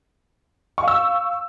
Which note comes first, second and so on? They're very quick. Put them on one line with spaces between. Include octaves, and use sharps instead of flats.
C#6 F5 E6